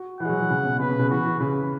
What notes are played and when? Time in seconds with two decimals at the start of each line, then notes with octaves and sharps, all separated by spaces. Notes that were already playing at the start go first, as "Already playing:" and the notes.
Already playing: F#4
0.20 E3 F#5
0.25 G#3
0.29 F#3
0.40 E3
0.50 C#3
0.65 B2
0.79 C#3 B4
0.89 B2
0.99 C#3
1.10 E3 F#4
1.25 E3
1.40 C#3 B4